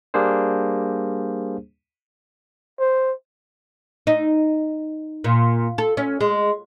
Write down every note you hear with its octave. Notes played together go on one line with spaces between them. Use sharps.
G3 A#3 D4 G#4 C5
C5
D#4
A#2
A4
C#4
G#3